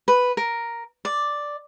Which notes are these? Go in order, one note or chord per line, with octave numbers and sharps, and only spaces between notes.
B4
A#4
D5